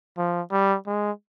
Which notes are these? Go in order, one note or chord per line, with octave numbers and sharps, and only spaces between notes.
F3
G3
G#3